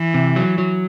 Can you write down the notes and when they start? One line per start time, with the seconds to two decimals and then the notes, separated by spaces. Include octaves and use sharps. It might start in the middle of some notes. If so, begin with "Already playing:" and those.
Already playing: E3
0.14 C3
0.36 F#3
0.58 F#3